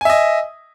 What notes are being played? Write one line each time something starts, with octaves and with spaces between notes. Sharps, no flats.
D#5 E5 G#5